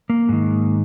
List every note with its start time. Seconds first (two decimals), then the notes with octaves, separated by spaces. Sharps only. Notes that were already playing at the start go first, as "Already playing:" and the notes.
0.10 A#3
0.29 G#2 D#3